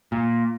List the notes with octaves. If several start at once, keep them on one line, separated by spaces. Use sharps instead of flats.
A#2